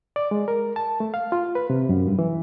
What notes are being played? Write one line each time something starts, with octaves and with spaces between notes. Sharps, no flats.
D5
G#3
A#4
A5
A3
F5
F4
B4
C3
F#2
G2
E3